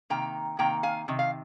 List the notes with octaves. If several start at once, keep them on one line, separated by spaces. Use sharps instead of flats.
C3 D#3 A#3 G5 A#5
C3 D#3 A#3 G5 A#5
F5 G#5
C3 D#3
F5